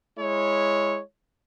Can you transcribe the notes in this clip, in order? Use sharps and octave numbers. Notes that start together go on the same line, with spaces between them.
G#3 E4 C#5